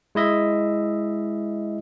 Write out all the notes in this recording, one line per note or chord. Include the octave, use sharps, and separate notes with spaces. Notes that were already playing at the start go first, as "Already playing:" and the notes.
G#3 E4 D#5 E5